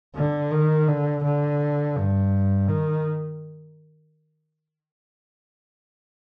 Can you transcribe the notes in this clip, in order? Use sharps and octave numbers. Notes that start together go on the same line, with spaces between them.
D3
D#3
D3
D3
G2
D#3